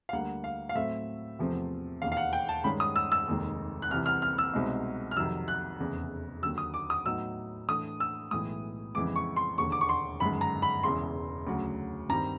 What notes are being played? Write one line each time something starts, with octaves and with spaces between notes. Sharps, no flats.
F5
D2 D3 G3 A#3 F#5
F5
F5
A2 F#3 A3 C4 E5
E2 C3 F3 A3 C4
E1 D#2 D#3 F5
F5
F#5
G5
A5
G2 D#3 G#3 C#4 B5
D#6
E6
E6
F1 D#2 D#3 G#3
F#6
C2 C3 E3 F6
F6
F6
E6
C2 B2 G#3 C4 D#4
F6
F2 C3 D#3 F#3 E6
F#6
F1 E2 C#3
D#2 D3 F#3 E6
D#6
D6
D#6
A2 F#3 B3 D#4 E6
A2 E3 A3 D4 D#6
E6
B1 A2 E3 G#3 D#6
F2 C#3 E3 G#3 B3 D6
C#6
C6
E1 D#2 D3 C#6
D6
C#6
C6
G1 F#2 D#3 G#3 B5
A#5
B5
E1 E2 C#3 E3 C6
D2 C#3 F#3
G2 D#3 G3 C4 A#5